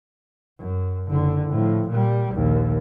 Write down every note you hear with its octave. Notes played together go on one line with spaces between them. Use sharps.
F#2
F#1 D3
A2 F3
A#2 G3
A#1 D#2